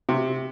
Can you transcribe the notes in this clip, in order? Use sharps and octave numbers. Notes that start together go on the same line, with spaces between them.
C3